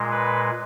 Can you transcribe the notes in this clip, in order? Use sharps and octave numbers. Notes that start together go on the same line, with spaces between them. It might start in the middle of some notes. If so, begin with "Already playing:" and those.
Already playing: A#2 G#3
B4